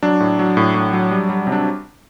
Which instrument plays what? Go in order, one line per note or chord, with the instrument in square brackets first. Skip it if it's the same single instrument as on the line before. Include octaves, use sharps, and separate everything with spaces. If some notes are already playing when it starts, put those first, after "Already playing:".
[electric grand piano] F#3 D4
A2
F#3
A2
A2
F#3
G3
G3
C3
D4